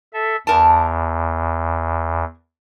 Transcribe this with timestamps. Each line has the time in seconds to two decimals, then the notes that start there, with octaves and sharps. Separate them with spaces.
0.13 A4 E5
0.47 E2 A#4 A5